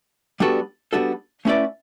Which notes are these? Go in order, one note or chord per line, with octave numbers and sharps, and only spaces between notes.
G3 B3 D4 F#4 A4
G3 B3 D4 F#4 A4
A3 C#4 E4 B4 D5